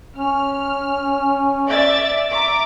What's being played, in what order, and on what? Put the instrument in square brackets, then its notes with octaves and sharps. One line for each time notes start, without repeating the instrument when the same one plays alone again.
[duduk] C#4 [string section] F6
[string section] D5 E5 A6
E5 A#5 D6